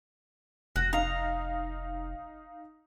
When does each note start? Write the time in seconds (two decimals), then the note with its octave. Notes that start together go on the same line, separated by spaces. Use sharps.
0.76 F1 F#4
0.93 D#4 F5 A#5